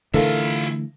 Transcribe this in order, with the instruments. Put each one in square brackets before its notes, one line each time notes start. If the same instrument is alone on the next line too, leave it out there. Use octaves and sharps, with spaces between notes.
[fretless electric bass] D3 E3 A3 [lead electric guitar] F4 E5 [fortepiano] A4 A#4 F5